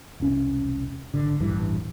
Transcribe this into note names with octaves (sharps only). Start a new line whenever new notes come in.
E1 C2 C#4
G#1 D3
D#1 A1 G2 E3